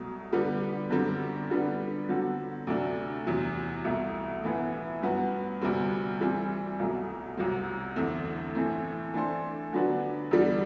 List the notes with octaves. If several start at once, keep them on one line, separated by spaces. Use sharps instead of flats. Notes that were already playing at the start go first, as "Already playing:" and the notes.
Already playing: C2 B2 F#3 A3
D3 G3 B3
F#2 D3 G3 C4
D3 G3 B3 D4
D3 F#3 C4 F#4 A4
D2 C3 F#3 A3 D4
E2 C3 F#3
C2 B2 A3 E4
A2 E3 B3 E4
G2 F#3 B3 F#4
D2 C3 G3 C4
E3 G3 C4
C2 B2 F#3 A3
C2 C3 F#3 C4
E2 D3 A3 C4
A2 E3 A3 C4
E3 A3 D4 A4 C5
D3 F#3 B3 D4 F#4
E2 D3 G3 D4